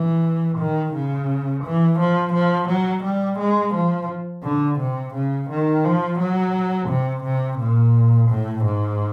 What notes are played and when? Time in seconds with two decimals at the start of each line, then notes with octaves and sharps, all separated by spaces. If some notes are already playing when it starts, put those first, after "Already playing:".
Already playing: E3
0.58 D#3
0.94 C#3
1.64 E3
2.00 F3
2.34 F3
2.69 F#3
3.04 G3
3.39 G#3
3.75 F3
4.44 D3
4.79 C3
5.15 C#3
5.50 D#3
5.85 F3
6.19 F#3
6.89 C3
7.24 C3
7.60 A#2
8.30 A2
8.65 G#2